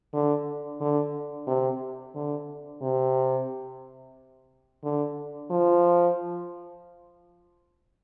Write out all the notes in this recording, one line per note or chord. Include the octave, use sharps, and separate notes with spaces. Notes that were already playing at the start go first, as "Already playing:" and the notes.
D3
D3
C3
D3
C3
D3
F3